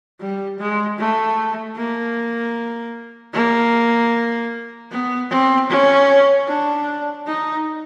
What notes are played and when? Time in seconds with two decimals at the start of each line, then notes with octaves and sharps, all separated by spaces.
0.20 G3
0.59 G#3
0.98 A3
1.76 A#3
3.34 A#3
4.91 B3
5.30 C4
5.69 C#4
6.48 D4
7.27 D#4